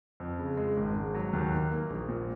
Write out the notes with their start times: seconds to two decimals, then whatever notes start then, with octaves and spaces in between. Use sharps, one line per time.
0.20 F2
0.39 C#3
0.57 G#3
0.77 G#1
0.95 G#2
1.15 F#3
1.33 D#2
1.53 D#3
1.71 A#3
1.90 A#1
2.09 A#2